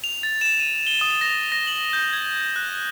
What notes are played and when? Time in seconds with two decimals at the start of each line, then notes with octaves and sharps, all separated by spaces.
0.04 F7
0.23 A6
0.41 E7
0.60 D#7
0.87 G7
1.01 D#6
1.21 A#6
1.52 A#6
1.67 F#7
1.93 G6
2.13 G#6
2.56 F#6